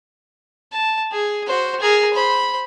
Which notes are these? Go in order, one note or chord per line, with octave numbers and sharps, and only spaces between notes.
A5
G#4
F#4 C5
G#4 A#4
C5 B5